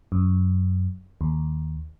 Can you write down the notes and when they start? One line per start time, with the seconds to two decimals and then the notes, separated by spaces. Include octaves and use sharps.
0.12 F#2
1.21 D#2